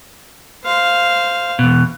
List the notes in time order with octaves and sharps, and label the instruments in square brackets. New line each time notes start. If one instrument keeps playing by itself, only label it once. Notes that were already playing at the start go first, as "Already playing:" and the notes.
[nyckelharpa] C5 F5
[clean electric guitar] E2 B2